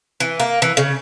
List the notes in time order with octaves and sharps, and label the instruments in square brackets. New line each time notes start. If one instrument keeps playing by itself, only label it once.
[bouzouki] E3
A#3
E3
C#3